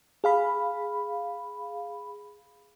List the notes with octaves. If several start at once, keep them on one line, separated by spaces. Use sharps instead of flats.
G#4 F5 B5